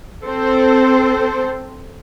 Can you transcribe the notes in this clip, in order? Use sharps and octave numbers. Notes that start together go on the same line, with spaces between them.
C4 A4 C5